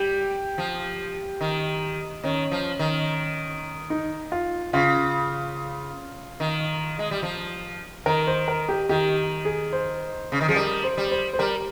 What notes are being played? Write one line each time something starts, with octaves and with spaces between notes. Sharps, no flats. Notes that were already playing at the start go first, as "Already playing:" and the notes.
Already playing: G3 G4
F3
D#3
D#3 C#4
F3
D#3
D#4
F4
C#3 F4
D#3
G#3
G3
F3
D#3 A#4
C5
A#4
G4
D#3 G4
G#4
C5
C#3
D#3
F3 G#4
G3 A#4
C5
G3
C5
C5
G3 A#4